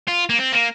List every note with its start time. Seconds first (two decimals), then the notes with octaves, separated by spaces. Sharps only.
0.08 F4
0.29 A#3
0.38 C4
0.52 A#3